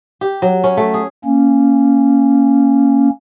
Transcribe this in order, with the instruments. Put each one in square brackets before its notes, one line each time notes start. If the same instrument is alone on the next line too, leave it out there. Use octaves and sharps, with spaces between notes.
[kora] G4
F#3
C#4
A3
G#4
[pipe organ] A#3 C#4